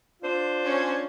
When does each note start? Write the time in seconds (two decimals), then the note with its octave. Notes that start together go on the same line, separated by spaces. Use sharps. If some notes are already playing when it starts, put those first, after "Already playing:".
0.22 D4 F4 C5
0.64 C#4